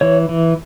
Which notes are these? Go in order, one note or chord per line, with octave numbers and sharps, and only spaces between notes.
E3 C#5
E3